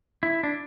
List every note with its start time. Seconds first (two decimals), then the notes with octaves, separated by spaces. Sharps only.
0.23 E4
0.43 D4